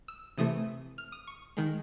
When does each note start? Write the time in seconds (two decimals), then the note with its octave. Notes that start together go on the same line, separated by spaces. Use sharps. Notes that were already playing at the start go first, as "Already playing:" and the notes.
0.08 E6
0.38 C3 E3 A3 D#6
0.98 F6
1.12 D#6
1.27 C#6
1.57 D#3 G#3